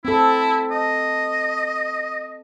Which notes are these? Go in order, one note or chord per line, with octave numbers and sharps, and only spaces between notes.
C4 E4 A4
D#5